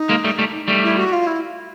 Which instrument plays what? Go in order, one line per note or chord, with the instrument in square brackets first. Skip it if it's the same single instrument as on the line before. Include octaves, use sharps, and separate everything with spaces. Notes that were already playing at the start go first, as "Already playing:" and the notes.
Already playing: [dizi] D#4
[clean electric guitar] G#3 A#3
G3 A3
G3 A3
G3 A3
[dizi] E4
F#4
F4
E4